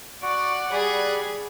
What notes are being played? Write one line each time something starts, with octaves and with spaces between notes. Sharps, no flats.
F#4 D5 F#5
G3 G#4 D5 B5